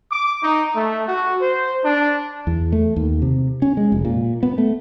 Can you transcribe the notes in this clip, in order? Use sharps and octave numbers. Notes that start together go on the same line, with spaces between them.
D6
D#4
A3
F#4
C5
D4
E2
A3
D#2
C3
C#4
G#3
F1
A#2
B3
A3